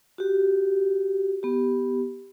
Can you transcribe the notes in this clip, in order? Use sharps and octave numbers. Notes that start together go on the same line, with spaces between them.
F#4 G4
B3 G4